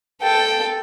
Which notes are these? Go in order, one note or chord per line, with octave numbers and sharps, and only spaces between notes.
A4 G5